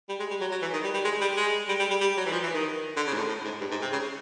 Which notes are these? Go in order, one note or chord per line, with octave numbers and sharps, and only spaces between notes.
G3
G#3
G3
F#3
F#3
E3
D#3
G3
G3
G#3
G3
G#3
G3
G3
G3
G3
F#3
E3
F3
E3
D#3
D3
C#3
G#2
A2
A2
G#2
G2
G#2
C3
C#3